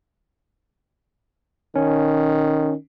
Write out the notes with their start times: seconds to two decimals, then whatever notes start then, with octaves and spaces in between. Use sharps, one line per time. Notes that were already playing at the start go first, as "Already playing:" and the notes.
1.76 D#3 C#4